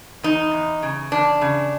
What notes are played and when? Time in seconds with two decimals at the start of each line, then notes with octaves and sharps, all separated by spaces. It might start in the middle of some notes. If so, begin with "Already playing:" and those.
0.23 E2 D#4
0.53 E2
0.83 C#3
1.12 E2 D4
1.41 C#3